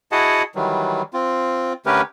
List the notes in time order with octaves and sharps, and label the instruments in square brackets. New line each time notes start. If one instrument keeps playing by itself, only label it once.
[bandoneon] E4 F#4 G#4 D#5 F#5 A5
D#3 E3 F#3 G3
C4 F4
D3 A3 C#4 G4 A#4 B4